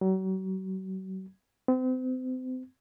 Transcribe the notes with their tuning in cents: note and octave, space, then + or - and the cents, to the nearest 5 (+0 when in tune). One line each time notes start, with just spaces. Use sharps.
F#3 +40
C4 -35